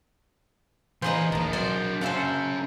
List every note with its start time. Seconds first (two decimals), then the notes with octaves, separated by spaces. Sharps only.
1.02 A#2 E3 G#4 B4 C5 D#5 A#5
1.32 A#1 D#2 D#3 D4 A#4 A5 A#5
1.53 C3 F#3 C5 D5 F#5 G#5
2.01 A#2 C#3 C#4 F#4 C5 E5 F#5 A5